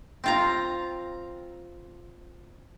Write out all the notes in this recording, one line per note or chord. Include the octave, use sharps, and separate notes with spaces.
C4 F4 A#5